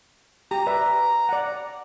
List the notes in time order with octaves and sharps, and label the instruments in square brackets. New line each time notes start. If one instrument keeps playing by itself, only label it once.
[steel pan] G4 [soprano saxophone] A#5
[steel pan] B4 D5 E5
D5 F#5